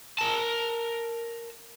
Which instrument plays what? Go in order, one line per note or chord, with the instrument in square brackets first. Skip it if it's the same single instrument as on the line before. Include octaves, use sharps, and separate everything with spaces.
[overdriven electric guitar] A#4 A5